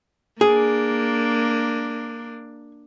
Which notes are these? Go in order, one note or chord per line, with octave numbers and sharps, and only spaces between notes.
A#3 D4 G#4